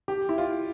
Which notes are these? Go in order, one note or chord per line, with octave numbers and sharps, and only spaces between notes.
G4
E4
F4